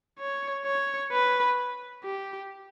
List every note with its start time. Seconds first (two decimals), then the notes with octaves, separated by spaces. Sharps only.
0.19 C#5
0.65 C#5
1.12 B4
2.04 G4